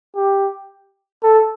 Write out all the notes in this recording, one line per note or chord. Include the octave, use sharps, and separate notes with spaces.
G4
A4